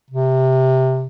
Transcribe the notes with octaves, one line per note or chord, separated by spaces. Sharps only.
C3